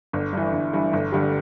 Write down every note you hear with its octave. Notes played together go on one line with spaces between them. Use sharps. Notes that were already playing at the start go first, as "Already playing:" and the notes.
G1
G2 E3
G1
G2 E3
G1
G2 D3 G3